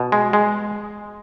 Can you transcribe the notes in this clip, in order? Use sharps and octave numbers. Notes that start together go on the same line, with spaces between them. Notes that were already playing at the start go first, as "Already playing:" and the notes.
Already playing: B2
G#3
G#3